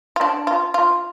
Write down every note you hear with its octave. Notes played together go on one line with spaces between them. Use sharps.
F4
D4
F4
F4